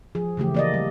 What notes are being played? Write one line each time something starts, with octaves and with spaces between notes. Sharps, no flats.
F3 G#4
C#3 E3 A3 G4
A#3 D5 D#5
G3